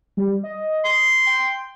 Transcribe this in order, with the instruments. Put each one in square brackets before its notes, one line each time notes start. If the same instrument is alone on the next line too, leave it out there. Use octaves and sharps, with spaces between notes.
[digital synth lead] G3
D#5
[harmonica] C6
[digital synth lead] G5